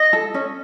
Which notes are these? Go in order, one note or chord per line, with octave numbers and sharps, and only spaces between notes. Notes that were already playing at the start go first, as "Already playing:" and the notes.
Already playing: D#5
A4
C#4